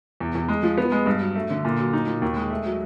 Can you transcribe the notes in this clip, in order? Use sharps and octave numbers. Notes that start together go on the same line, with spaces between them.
E2
E2
G#3
F3
B3
G#3
G2
F#3
A3
D3
A#2
F#3
D#4
A#2
D#2
G#3
A3
F#3